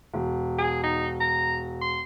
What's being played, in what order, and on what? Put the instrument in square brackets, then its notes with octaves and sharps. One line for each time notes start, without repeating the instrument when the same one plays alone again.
[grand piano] E1
[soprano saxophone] G#4
D#4
A#5
C6